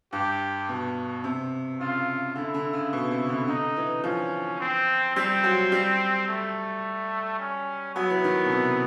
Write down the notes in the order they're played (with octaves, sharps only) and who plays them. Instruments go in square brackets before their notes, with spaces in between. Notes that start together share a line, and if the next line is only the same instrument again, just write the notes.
[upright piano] G2 [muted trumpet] G4
[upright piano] B2
C3
[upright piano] C#3 [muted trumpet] F4
[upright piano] D3 [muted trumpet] E4
[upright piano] D3
C#3
B2
C3
D3
[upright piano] D3 [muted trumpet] D#4
[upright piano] E3
[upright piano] F3 [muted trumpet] C#4
[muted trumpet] C4
[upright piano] G3 [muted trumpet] C4
[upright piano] F#3
G3
[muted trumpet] A3
C#4
[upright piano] F#3 [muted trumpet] B3
[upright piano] E3
D#3
B2
C3